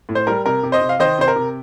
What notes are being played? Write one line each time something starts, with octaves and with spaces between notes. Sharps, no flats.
A2
C5
G3 A#4
C3 A#4
C3
C5 D#5
C3
F5
D#3 C5 D#5
C3 C5
A#4
C3